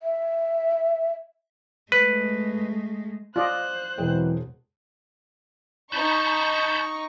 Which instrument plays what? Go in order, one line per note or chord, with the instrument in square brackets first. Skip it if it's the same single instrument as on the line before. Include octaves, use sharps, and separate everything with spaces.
[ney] E5
[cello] G#3 A3 [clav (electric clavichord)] B4
[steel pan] F4 D5 D#5 [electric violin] C5 F#6
[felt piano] E1 G#3 G5 [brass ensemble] E3 F#3 C4
[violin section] D#4 C#6 [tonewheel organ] A5 B5 G6